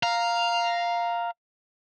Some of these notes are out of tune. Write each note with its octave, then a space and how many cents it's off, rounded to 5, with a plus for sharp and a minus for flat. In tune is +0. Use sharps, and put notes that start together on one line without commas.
F5 +0 A#5 +0